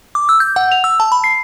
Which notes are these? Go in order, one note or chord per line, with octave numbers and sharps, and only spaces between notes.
D6
E6
G6
F#5
F7
E6
A5
B5
C7